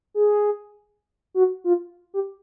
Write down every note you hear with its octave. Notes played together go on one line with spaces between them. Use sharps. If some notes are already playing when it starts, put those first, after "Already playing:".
G#4
F#4
F4
G4